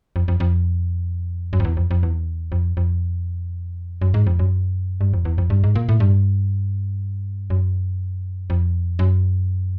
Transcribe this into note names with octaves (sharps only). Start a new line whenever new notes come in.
F2
F2
F2
F#2
F2
E2
F2
F2
E2
F2
F2
F#2
G#2
F2
F#2
G2
F2
E2
F2
G2
G#2
A#2
A2
G2
F#2
F2
F#2